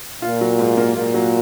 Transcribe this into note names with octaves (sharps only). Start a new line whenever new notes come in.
A#2 F4
F#3
G#2
A#3
A#2 F4
F#3